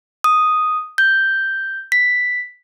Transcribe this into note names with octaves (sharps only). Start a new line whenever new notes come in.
D#6
G6
B6